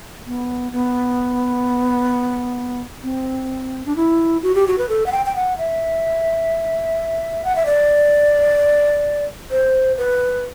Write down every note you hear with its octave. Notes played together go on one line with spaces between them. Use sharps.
B3
B3
C4
D4
E4
F#4
G4
F#4
B4
A4
F#5
G5
G5
F#5
E5
F#5
E5
D5
C5
B4